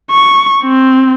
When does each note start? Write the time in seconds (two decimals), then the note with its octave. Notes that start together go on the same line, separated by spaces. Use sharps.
0.10 C#6
0.63 C4